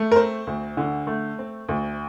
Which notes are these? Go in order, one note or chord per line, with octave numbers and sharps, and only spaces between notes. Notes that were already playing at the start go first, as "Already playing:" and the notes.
Already playing: A3
A#4
C4 C5
D2
D3
A3
C4
D2